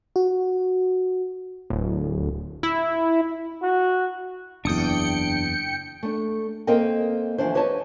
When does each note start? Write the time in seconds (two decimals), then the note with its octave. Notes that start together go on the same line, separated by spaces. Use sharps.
0.16 F#4
1.70 D1
2.63 E4
3.62 F#4
4.65 F#1 E2 D4 G5 D#6 C#7
6.03 A3 D4
6.67 A#3 C4 A4 A#4 D#5 G5
7.38 D2 B2 E3 F3 D4 C5
7.54 G4 B4 C#5 D#5 A5